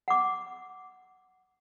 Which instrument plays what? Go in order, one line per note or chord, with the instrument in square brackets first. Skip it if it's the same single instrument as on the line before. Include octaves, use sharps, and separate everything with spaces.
[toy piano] F#5 D6